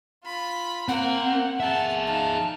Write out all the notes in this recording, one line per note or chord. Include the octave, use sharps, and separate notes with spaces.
F4 B5
A#3 C4 A#4 F#5
G#4 E5 A5
D#4 F5 A5